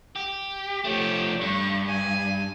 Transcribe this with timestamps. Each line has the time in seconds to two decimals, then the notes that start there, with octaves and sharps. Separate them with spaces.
0.16 G4
0.84 F3 A3 G4 C#5
1.41 G2 C#6
1.89 G#5